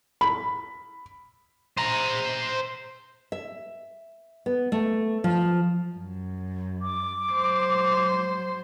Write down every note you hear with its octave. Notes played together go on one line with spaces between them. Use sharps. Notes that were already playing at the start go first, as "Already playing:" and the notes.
B5
C5 A#5
E5
B3
A3
F3
F#2
D6
F#3 C5